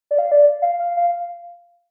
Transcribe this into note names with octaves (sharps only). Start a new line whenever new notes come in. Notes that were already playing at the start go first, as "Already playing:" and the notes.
D5
F5
D5
F5
F5
F5